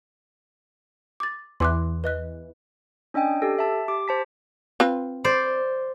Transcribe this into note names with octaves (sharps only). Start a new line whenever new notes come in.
D6 A6
E2 E3 C6 D6 F#6
B4 D#5 F#6
C#4 D4 D#5 G5 G#5
G4 A4
E5 A5
G4 D6
C5 A5 B6
C4 F4 B4
C5 D5